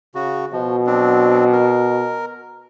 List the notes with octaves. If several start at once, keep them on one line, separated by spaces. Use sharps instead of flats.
C#3 F#4
B2 F3
F#3 C4 D4
A#4